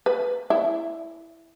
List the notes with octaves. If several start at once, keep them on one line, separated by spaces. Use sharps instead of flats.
B4
E4